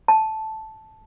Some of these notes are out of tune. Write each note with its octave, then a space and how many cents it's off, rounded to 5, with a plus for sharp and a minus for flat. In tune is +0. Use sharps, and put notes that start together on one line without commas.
A5 -5